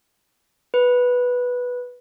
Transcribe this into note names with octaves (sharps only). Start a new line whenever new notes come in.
B4